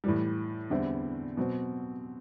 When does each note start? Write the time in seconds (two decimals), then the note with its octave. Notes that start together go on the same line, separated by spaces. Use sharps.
0.04 A2 E3 G3
0.70 E2 D3 G3 C4 E4
1.37 B2 F#3 C4